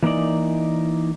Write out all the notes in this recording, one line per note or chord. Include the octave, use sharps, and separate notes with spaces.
E3 A#3 D4 D#4 D5